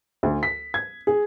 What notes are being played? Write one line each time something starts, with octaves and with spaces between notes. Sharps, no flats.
D2
B6
G#6
G#4